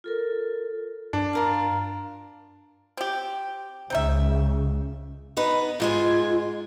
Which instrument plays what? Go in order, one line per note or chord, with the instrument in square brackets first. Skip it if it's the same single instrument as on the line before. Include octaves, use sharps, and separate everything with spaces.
[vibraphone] F4 A4 A#4
[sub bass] G2 [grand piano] D4
[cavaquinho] F4 A#4 F5
[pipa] C4 G4
[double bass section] C#2 C#3 [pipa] C4 D#4 E5
[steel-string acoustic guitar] B3 D#4 B4
[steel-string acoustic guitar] G#2 G#3 G#5 [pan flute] F4